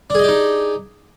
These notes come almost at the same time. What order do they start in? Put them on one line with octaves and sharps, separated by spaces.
D4 G#4 D#5 G4 D#4